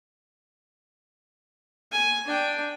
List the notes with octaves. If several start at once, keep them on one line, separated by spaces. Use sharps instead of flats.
G#5
D4 G5